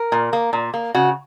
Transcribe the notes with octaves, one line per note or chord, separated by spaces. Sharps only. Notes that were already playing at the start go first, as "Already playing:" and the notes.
Already playing: A#4
A#2
A#3
A#2
A#3
C#3 F#4